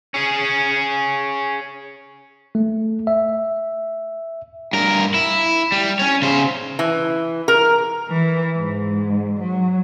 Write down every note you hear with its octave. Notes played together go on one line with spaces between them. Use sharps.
C#4 G#4
A3
E5
G2 A#4
E4
G3
C#4 C#5
C#3 C5
E3
A#4
E3
G#2
F#3